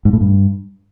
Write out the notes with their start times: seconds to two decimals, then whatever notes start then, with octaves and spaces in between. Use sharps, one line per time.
0.05 G#2
0.13 A2
0.21 G2